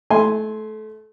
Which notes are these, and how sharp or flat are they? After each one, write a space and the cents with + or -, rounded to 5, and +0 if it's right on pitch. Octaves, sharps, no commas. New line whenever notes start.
A3 -25 G#5 +0 C6 +0